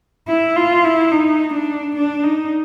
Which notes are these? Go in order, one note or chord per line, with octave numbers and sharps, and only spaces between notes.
E4
F4
E4
D#4
D4
D4
D#4